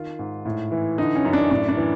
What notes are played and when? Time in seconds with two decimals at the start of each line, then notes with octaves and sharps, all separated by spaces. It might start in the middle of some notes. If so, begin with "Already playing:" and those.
Already playing: D#3 F4
0.19 G#2
0.45 A2
0.72 E3
0.98 D3 D#4
1.15 C#4
1.25 F#2
1.33 D4
1.51 A2 D4
1.69 D4
1.77 E3